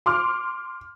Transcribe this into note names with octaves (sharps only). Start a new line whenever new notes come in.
C6 D6 F6